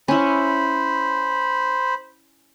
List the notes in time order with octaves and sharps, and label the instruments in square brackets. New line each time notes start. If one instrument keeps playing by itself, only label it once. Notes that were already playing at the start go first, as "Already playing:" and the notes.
[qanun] C#4 E4 [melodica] C5 B5